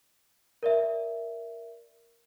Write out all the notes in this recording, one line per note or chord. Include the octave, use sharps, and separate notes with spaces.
A#4 D5 E5